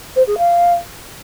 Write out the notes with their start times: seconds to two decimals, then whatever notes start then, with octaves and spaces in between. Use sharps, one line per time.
0.16 C5
0.27 G#4
0.38 F5